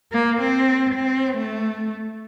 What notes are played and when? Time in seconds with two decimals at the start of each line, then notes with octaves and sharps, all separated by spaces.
0.12 A#3
0.41 C4
0.94 C4
1.38 A3